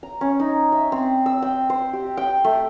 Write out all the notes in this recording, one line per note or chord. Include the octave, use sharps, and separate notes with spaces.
A#5
C#4
D#4
E5
C4
E6
G5
C5
G4
G5
A3